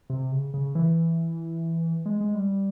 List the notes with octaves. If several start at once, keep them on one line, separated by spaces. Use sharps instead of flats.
C3
C#3
C#3
E3
G#3
G#3
G3